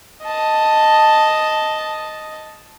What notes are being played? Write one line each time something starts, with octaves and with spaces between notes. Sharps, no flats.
D#5 A5